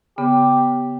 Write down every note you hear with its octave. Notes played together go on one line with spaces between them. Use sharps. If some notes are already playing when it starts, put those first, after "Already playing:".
C#3 B3 G4